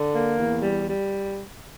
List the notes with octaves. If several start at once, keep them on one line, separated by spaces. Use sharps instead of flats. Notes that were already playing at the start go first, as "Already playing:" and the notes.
Already playing: D3
A#3
E2
G3
G3